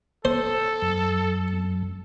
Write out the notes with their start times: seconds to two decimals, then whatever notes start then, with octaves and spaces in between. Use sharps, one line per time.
0.25 A4 C5
0.82 F#2